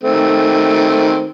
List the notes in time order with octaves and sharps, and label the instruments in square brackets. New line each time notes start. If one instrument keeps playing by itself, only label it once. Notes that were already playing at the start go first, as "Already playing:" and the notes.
[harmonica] D#3 A3 C4